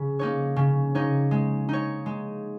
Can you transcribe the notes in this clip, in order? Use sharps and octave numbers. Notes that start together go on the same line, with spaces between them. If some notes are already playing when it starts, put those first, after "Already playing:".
Already playing: C#3
A#3 D#4 C#5
C#3
A#3 D#4 C#5
G#3
D#4 C#5
G#3